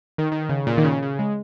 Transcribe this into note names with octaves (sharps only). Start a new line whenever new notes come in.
D#3
D#3
C#3
A#2
D#3
C#3
C#3
G#3